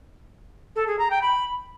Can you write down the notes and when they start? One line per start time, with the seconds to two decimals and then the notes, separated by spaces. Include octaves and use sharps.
0.76 A4
0.87 G#4
0.99 A#5
1.10 G5
1.22 B5